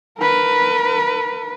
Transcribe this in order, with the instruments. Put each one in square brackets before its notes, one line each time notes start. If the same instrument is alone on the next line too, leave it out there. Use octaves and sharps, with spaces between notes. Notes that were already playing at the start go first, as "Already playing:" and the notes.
[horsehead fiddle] A#4 B4